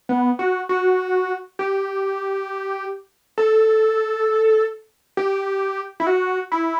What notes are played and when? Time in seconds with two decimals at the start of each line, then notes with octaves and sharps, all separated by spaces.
0.09 B3
0.39 F#4
0.69 F#4
1.59 G4
3.38 A4
5.17 G4
6.00 E4
6.07 F#4
6.52 E4